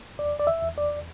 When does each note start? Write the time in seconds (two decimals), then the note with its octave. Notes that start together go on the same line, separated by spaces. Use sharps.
0.19 E2 D5
0.40 D5
0.47 E5
0.62 E2
0.78 D5